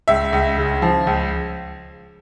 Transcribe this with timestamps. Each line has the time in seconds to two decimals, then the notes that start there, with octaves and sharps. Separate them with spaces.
0.08 C#2 E5
0.33 C#2
0.58 C#3
0.82 F3
1.07 C#2